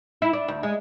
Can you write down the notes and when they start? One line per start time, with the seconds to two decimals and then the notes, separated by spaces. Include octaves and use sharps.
0.22 E4
0.33 D4
0.48 D2
0.63 G#3